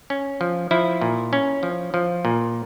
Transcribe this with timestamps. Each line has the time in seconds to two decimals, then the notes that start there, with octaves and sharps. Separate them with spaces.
0.10 C#4
0.41 F3
0.71 F3 E4
1.01 A#2
1.33 C#4
1.63 F3
1.94 F3
2.25 A#2